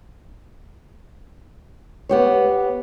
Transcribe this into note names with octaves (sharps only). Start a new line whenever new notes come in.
B3 G4 C#5